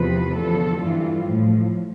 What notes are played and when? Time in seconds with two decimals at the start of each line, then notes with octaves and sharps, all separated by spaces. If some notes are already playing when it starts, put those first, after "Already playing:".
Already playing: E2 C3 F3 B4
0.36 E2 D3 F3 A4
0.80 G2 E3 G3 F4
1.25 A2 F3